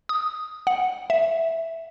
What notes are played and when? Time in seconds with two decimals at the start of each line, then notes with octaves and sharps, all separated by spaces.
0.09 D#6
0.67 F#5
1.10 E5